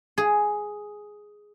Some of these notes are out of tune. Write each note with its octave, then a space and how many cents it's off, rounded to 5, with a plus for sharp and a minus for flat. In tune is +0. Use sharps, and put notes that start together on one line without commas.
G#4 +5